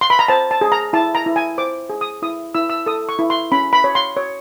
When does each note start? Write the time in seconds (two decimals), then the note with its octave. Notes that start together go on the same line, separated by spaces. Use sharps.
0.01 C6
0.10 B5
0.19 A#5
0.28 C5 A5
0.51 A5
0.61 G#4
0.72 A#5
0.93 E4 A5
1.15 A#5
1.26 E4
1.36 G#5
1.58 C5 D6
1.90 G#4
2.01 D#6
2.22 E4 D#6
2.55 E4 E6
2.70 E6
2.86 A4 D#6
3.09 C#6
3.19 E4
3.30 C6
3.52 C#4 B5
3.73 B5
3.84 C#5
3.95 C6
4.17 C#5